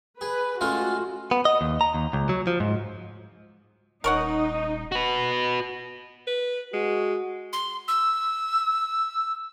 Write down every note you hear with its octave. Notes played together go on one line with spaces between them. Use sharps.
G#4 B4
G#3 A3 C#4 F4 F#4
B3
D#5
D#2
A#5
D#2
C#2
F#3
F3
G#2
D#1 D#4 A#4 C#5 F#5
F#4 B4
B4
G#3 F#4
C6
E6